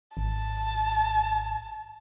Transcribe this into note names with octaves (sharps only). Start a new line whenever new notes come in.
G#1 A5